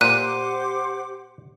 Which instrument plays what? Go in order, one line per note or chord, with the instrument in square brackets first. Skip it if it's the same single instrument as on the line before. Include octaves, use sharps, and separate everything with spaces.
[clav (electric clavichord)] A#2 [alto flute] G4 [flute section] C5 F#5 D6 [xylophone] F#6 D#7